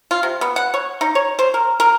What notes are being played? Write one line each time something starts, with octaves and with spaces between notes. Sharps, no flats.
F4
C3
B3
F#5
C#5
D#4
C#5
C5
A#4
A#4